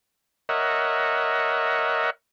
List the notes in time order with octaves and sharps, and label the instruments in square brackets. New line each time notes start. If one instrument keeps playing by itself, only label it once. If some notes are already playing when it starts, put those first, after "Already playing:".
[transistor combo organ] A#4 C#5 D#5 E5 F#5